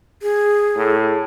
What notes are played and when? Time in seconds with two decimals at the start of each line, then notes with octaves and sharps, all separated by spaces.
0.22 G#4
0.76 A2